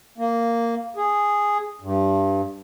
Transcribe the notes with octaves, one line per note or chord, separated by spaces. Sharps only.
A#3
G#4
G2